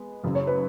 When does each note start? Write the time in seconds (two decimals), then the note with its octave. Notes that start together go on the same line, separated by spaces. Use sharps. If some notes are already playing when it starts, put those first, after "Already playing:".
Already playing: G#3 B3
0.23 F#1 F#2 C#3
0.35 C#5
0.47 B4